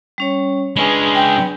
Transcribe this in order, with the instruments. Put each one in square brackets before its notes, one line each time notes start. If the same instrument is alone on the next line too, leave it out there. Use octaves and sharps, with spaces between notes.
[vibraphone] G3 C#4 C#5
[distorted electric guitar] G#3 C#4 [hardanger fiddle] D4 G#4 [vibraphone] B4 B5
[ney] G5